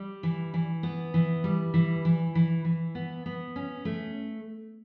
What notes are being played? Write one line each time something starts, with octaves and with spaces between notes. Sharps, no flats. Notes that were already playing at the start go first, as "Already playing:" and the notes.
Already playing: G3
E3
E3
B3
E3
G3
E3
E3
E3
E3
B3
B3
C#4
A3